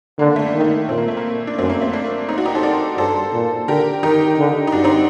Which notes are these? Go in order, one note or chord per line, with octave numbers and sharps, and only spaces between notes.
D3 A#3
A3
A#3
D#3
A3
A#2 C4
A#3
A3
A#3
D4
F#2 A3 C4
A#3
A3 C4
A#3 D4
C4 D#4
D4 F#4
D#4 G4
A4 C5
A#4 D5
G2 A4 C5
A#2
D3 G4 A#4
D#3 D#4 G4
D3
D#4
G2 D4 F#4
C4 D#4